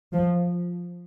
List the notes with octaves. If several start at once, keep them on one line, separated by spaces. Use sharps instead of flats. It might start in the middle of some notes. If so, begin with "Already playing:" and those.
F3